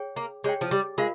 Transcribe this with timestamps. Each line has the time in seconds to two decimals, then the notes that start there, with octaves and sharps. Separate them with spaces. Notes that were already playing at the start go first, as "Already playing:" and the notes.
Already playing: G#4 C#5 G5
0.16 A#3
0.44 G#3 G#4 C#5 G5
0.61 F3
0.71 G3
0.98 G#3 F4 A#4 F5